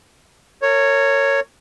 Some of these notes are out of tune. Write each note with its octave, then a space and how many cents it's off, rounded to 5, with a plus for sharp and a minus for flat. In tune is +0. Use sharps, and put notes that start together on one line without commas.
A#4 -35 C#5 +0